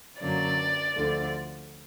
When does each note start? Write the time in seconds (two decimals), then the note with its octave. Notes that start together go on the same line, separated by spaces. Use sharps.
0.21 F#2 D3 F#3 A#3 D5
0.96 D2 D3 F3